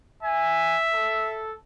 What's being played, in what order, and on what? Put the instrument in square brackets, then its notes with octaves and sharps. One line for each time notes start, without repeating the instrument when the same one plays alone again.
[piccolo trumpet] E5 [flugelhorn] G#5
[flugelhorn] A4